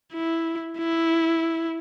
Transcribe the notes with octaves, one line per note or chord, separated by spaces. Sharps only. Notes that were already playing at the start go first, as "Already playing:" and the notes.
E4
E4